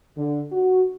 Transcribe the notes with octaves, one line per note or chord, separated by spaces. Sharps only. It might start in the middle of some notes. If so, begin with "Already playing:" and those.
D3
F#4